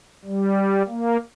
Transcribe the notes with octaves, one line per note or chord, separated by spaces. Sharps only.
G3
A#3